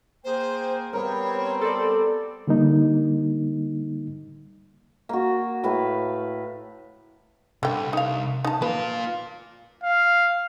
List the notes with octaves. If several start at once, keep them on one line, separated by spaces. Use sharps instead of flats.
A#3 G#4 C5 G5
G3 B3 C4 A#4 C#5
A4 D5 C6
D3 G3 A#3 D#4
A#3 F#4
A2 B4 F5
C2 D3 G5
D#4 F5
D#4 A5
A#3 F4 B4
F5